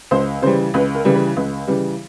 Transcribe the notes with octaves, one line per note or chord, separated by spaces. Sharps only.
C#2 C5
C#3 E3 G3 C5
C#2 B4
A#4
C#3 E3 G3
B4
C#2
C#3 E3 G3